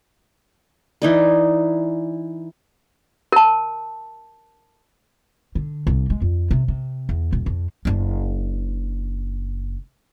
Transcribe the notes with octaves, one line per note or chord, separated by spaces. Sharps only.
E3 D#4 D5
A#4 A5
D3
C2
G#3
F2
C3
C3
E2
D#1
F2
F#1 D4